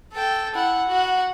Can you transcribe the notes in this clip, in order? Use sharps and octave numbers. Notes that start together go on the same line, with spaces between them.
A4 G5
E4 F#5
F#4 F#5